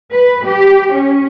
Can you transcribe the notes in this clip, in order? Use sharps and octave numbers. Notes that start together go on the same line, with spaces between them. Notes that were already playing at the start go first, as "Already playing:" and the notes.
B4
G4
C#4